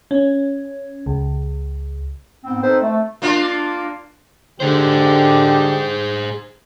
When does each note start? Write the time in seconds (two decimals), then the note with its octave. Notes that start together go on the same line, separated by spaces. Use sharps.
0.11 C#4
1.06 C#2
2.44 G#2 B3 C4
2.63 C4 D#4 A4 B4 C5
2.82 A3
3.22 A#3 D4 F4
4.60 D3 G4 G#4 C5